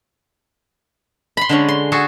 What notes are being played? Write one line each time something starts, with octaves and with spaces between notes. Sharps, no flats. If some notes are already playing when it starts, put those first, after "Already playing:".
B5 C6
D3 G#3 C#4
C6
F#4 G#4 A4